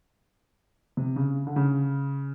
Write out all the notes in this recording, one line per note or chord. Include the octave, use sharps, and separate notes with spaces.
C3
C#3
D3
C#3